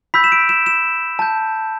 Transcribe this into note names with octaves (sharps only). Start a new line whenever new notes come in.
B5 E6 G6 B6
E7
D7
E7
E7
A5 G6